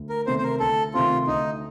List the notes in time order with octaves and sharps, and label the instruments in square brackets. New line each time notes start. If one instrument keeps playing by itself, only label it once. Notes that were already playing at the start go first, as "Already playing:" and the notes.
Already playing: [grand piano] D2
[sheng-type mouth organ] A#4
[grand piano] C3 D#3 A3 C4 [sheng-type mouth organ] C5
[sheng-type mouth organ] C5
A#4
[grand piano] D2 [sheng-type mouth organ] A4
[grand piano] C3 D#3 A3 C4 [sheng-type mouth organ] F4
[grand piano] D2 [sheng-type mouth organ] D#4